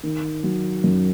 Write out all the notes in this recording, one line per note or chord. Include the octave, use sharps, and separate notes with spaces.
D#3
F#3
F#2